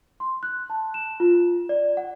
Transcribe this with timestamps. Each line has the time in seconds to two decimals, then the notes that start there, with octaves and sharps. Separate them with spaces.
0.20 C6
0.43 F#6
0.70 A5
0.94 E7
1.20 F4
1.69 D5
1.97 F#5